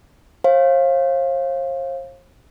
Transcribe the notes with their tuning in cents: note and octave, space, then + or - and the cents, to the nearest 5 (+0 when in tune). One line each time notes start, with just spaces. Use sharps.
C5 +45 F5 -5